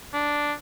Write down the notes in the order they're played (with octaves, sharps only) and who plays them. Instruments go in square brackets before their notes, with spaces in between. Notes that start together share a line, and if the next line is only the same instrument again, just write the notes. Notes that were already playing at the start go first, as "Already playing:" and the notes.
[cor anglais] D4